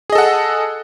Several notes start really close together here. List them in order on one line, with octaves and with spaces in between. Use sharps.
G#4 D#5 A4 F#5